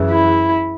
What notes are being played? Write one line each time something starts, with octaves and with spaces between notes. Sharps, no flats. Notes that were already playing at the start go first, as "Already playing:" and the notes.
Already playing: F#2 C#3 E3
E4